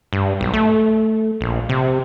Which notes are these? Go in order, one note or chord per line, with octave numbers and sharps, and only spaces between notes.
G2
B1
A3
A#1
C3